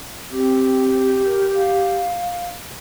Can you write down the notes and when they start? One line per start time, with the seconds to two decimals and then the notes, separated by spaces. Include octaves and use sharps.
0.31 C4 G4
1.26 A#4
1.55 F5